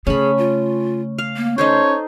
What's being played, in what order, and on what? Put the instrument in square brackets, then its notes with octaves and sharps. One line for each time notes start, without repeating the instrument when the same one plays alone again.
[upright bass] C#3 A3 [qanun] C#4 A5 B5 [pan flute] G#4
[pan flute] F4
[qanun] F5
[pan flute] A#3
[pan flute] C#4 [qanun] D#4 A4 C5 [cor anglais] C#5